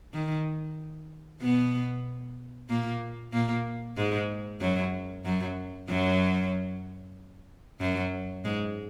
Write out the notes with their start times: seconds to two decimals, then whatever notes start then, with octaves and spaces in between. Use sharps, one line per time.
0.14 D#3
1.42 B2 B3
2.69 A#2 A#3
3.33 A#2 A#3
3.97 G#2 G#3
4.61 F#2 F#3
5.25 F#2 F#3
5.89 F#2 F#3
7.81 F#2 F#3
8.45 G#2 G#3